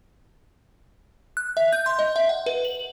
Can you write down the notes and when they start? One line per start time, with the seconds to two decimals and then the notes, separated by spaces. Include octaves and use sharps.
1.37 F#6
1.57 E5
1.73 G6
1.86 C6
1.99 D#5
2.16 E5
2.29 F#5
2.46 B4
2.65 F#7